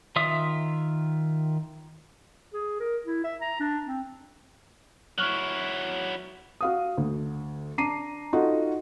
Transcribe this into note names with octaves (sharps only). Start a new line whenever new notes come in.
D#3 F4 E5 D#6
G#4
A#4
E4
E5
A#5
D4
C4
F#3 E4 C#6 F6 F#6
F#4 F5 D#6
D2
D4 A#5 D6 C7 D#7
D#4 F4 F#4 A4 D#5